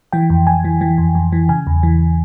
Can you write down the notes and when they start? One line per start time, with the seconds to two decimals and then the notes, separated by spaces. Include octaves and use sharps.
0.13 E3 G5
0.30 F2
0.47 F2 G#5
0.64 E3
0.81 E3
0.98 F2
1.15 F2
1.32 E3
1.49 C#3 G#5
1.67 E2
1.83 E3